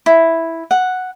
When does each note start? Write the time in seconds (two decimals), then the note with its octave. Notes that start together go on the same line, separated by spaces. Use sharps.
0.06 E4
0.71 F#5